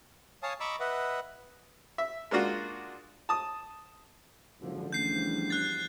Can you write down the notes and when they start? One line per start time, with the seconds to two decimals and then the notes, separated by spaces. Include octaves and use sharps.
0.43 C#5 F5 G#5 A5 D#6
0.60 D#5 A#5 B5 C#6 D6 E6
0.80 B4 D#5 E5 F#5
1.98 E5
2.31 G#3 A#3 D4 F4 F#4
3.29 A5 D#6
4.60 F#1 G#2 D3 F3
4.93 E2 F3 G3 A3 C#4 D4 G6 C7
5.50 F#6 A6